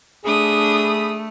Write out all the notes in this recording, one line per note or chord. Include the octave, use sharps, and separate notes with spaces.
A3 D4 G#4 B5 D#6